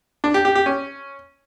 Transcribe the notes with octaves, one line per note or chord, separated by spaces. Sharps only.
D4
G4
G4
G4
C#4